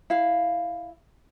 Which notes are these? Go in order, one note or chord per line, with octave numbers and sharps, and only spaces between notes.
E4 F5